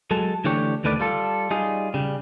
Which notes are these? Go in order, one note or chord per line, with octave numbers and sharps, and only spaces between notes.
F#3 G#3 A4
D3 E3 A3 D4 G4 C#5
D2 D#3 A3 B4 D5
G3 F4 A4
G3 D#4 F4 G#4
C#3 G3